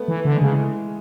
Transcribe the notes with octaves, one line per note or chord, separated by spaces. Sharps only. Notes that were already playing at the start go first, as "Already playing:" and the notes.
Already playing: A3 B3
E3
D3 A3
G#3
C#3
E3